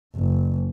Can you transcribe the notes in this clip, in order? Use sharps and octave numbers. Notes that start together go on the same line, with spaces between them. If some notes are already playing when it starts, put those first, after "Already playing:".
F#1